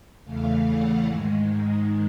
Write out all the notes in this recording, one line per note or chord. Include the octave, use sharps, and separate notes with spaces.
E2 C#3 E3 A3 F5
F#5
G#2 D#3 G#3